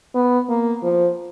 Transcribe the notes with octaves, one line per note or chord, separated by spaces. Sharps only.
B3
A#3
F3